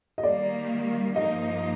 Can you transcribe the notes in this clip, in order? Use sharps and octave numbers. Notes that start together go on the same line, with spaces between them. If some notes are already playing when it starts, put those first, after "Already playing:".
D#5
D#3 G3 A#3 D5
G2 F3 A#3 D#4 D#5